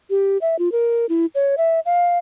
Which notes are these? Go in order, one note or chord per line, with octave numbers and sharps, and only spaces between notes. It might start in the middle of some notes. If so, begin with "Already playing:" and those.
G4
E5
F4
A#4
E4
C#5
E5
F5